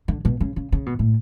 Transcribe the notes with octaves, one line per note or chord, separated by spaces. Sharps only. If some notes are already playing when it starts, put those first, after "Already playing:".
D3
B2
C#3
C#3
C#3
B2
A2